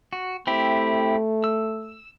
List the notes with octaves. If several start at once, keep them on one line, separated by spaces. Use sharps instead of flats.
F#4
A3 C4 E4 G4
E6